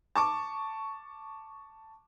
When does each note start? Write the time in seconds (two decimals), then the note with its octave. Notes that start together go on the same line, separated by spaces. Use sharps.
0.16 A5 C#6 D6